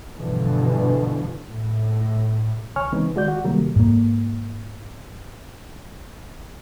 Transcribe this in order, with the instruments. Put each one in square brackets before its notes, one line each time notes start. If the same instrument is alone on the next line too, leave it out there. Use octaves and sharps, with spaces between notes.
[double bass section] G2 B2 D3 E3 F3
A2
[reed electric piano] C#2 C#5 G#5 C#6 F6
C#3 E3 G#3 B3 C4 D#4
D#3 G#3 F#4 D5 G6
F#4 F#5
C3 D#3 F#3 G3 A3 A#3
[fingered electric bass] G#2 A#3